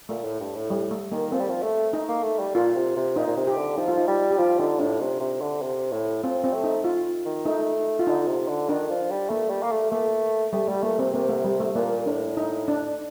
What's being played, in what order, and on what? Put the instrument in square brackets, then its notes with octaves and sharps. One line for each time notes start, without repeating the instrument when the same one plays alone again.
[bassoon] A#2 [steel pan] A3
[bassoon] A2
G2
A2
[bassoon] A2 [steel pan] G3
[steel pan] A3
[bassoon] D#3 [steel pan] A#3
[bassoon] F3 [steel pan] C4
[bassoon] G3
F3
A3
[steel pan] D#4
[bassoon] A#3
A3
G3
[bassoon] A#2 [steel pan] F4
[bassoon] C3
C3
[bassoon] A#2 [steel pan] D#4
[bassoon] A#2
C3
[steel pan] G4
[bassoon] D3
[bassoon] F3 [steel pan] D#4
[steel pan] F4
D#4
[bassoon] G3
[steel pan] G4
[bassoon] F3 [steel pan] F4
[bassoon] D3 [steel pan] D#4
[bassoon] A2 [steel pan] D4
[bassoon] C3
C3
D3
C3
A2
[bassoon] F3 [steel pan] C4
[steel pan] C4
[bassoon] A3
[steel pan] D#4
F4
[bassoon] D#3
[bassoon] A3 [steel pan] D#4
[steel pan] F4
[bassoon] D3 [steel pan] D#4
[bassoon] C3
D3
[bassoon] D#3 [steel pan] D4
[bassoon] F3
G3
[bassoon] A3 [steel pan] A#3
[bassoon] G3
A#3
A3
[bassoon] A3 [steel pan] A#3
[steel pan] G3 [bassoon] A3
[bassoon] G3 [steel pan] A3
[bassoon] A3 [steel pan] A#3
[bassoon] C3 [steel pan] C4
[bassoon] C3 [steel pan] A#3
[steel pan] A3
G3
A3
[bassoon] A#2 [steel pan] A#3
[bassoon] A2 [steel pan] D4
[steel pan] D#4
D4